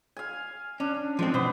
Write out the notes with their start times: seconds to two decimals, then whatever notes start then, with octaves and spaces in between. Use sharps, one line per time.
0.17 F5 G#5
0.80 C#4 D4
1.19 F3 G#3 C4
1.34 B2 B3 C5